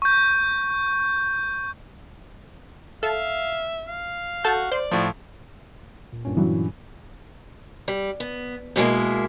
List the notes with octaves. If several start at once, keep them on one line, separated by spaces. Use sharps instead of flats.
C#6 G6
A4 E5 F5
F5
F#4 A4 A5 G6
C5 D5
A2 F3
A#2
G2 A#2 C#4
E3 F#3
G3
B3
B2 G3 G#3 A#3 E4